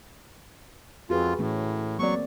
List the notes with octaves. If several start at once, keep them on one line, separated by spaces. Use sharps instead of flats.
F2 F4 F#4 G#4 B4
A2 E3 A3 C#4
F#3 A#3 C4 D5 C#6